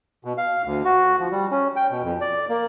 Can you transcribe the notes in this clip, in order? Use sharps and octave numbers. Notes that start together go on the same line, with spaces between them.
B2
F5
D2
F#4
F3
G3
C#4
G5
B2
F2
D5
A#3